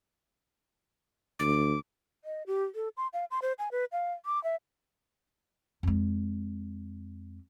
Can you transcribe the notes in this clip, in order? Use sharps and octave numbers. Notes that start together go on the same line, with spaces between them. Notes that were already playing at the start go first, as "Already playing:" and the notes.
D2 D6
D#5
G4
A4
C6
F5
C6
C5
G#5
B4
F5
D6
E5
F2 G#3